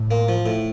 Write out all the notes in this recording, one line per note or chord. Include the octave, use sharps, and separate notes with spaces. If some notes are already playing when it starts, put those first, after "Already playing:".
Already playing: A2
A#3
F3
A2